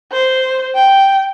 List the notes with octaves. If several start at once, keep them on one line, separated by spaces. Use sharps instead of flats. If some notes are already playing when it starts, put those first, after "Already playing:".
C5
G5